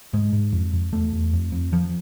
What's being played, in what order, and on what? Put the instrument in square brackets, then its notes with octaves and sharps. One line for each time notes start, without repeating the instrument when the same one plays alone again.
[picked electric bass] G#2 G#3
G#2
F2
F2
E2 A3
E2
F2
F2
F2 F3